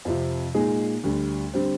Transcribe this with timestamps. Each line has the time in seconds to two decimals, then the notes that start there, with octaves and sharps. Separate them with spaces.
0.05 F2 C3 F3
0.54 A#2 G#3 D#4 G#4
1.03 D2 D3 G3
1.54 D3 G3 C4